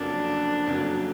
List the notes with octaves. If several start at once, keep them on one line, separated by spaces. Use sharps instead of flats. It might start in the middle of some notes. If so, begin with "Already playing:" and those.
Already playing: F1 F2 C#3 F#3 A#3 D4
F1 F2 C#3 F#3 A#3